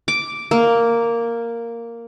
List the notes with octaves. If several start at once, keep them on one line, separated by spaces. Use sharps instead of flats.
D6
A#3